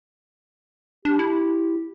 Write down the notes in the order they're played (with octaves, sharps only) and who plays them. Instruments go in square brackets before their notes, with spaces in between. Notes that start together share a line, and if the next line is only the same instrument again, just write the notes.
[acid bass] D4 [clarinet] G4
[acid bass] E4